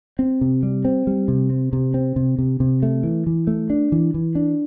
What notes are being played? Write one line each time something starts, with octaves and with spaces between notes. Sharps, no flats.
C4
C3
G3
C4
G3
C3
C4
C3
C4
C3
C3
C3
A3
E3
E3
A3
D4
E3
E3
D4